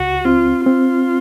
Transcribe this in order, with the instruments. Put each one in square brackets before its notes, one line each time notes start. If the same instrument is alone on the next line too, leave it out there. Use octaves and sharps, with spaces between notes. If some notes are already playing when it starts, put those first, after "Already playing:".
Already playing: [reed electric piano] C#2 [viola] F#4
[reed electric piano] C4 [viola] F4
[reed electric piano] C4 [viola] F4